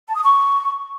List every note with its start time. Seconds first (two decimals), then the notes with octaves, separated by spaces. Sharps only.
0.08 A5
0.16 D#6
0.23 C#6